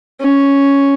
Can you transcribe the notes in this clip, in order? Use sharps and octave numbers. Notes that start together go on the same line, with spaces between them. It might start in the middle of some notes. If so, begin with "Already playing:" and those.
C#4